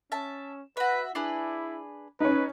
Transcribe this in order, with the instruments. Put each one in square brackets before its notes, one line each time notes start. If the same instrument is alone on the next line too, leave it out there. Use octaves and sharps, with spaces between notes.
[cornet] C#4 [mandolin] E5 A5
[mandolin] F#4 E5 [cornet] B4
[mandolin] D4 G#4 B4 [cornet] E4
[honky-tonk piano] C#4 D#4 [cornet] B4